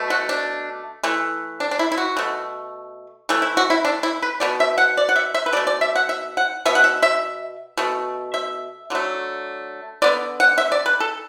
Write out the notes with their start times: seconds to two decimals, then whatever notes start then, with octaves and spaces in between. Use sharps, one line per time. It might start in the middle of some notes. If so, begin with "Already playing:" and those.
Already playing: B2 A3
0.10 F#4
0.29 D4
1.03 E3 A3
1.60 D4
1.71 D4
1.79 E4
1.92 E4
1.97 F#4
2.17 B2 A3
3.29 E3 A3
3.42 E4
3.57 F#4
3.70 E4
3.85 D4
4.03 E4
4.22 B4
4.40 B2 B3 D5
4.60 E5
4.78 F#5
4.97 D5
5.09 F#5
5.16 E5
5.34 E5
5.46 B4
5.53 B2 D5
5.57 A3
5.67 D5
5.81 E5
5.95 F#5
6.09 E5
6.37 F#5
6.65 B2 B3 E5
6.75 F#5
6.84 E5
7.02 E5
7.77 B2 A3
8.34 E5
8.90 D3 F#3 A3
10.02 D3 B3 D5
10.40 F#5
10.58 E5
10.72 D5
10.86 B4
11.00 A4